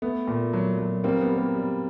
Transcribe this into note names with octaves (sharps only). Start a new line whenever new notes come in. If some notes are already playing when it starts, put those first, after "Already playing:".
A3 B3
A#2
F#3
F#3
G3 A#3 C4
B3
G3
A#3
G3